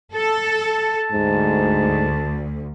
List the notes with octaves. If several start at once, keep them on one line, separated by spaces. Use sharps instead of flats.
A4 A5
D2 G#2